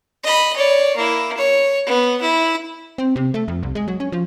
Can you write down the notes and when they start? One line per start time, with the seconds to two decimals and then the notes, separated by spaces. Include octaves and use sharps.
0.23 D#5 B5
0.56 C#5 D5
0.95 A#3 E4
1.38 C#5
1.86 B3
2.21 E4
2.98 C4
3.16 C3
3.34 A3
3.48 F2
3.63 C2
3.75 G#3
3.88 F#3
4.00 C#4
4.12 F3